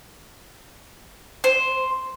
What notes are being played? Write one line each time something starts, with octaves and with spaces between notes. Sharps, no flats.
C5